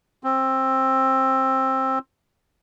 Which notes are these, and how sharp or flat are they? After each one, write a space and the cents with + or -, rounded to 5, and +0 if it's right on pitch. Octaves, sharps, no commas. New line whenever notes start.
C4 +15